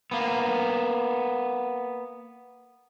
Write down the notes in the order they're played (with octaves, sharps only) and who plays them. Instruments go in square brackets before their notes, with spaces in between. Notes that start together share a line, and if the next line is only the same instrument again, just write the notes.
[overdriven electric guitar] A#3 B3